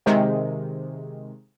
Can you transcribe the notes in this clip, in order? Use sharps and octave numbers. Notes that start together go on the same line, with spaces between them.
C3 D#3 G#3